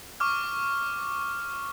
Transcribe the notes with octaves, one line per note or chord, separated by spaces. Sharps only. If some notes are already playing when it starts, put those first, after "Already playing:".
C#6 D6 F6